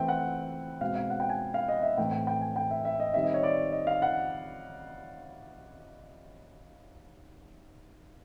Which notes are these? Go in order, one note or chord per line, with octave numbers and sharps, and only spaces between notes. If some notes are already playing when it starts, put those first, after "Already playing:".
Already playing: E3 A3 C4 E5 G5
F#5
B2 G#3 C4 F5
F5
F#5
G5
G#5
F5
D#5
E5
A2 E3 A3 C4 G5
G5
G5
G#5
G5
E5
E5
D#5
D#3 G3 C4 E5
D#5
C#5
D5
D#5
F5
F#5